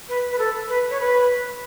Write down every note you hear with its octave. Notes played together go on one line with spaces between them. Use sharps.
B4
B4
A4
B4
C#5
B4